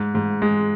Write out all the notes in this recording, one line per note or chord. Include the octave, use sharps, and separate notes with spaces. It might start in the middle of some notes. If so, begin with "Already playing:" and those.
Already playing: G#2
G#2
G#3